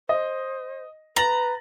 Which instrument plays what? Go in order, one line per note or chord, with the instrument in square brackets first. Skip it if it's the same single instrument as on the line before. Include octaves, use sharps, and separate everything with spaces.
[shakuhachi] C5 [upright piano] D#5
[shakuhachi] B4 [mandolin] A#5 [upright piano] A6 A#6 F#7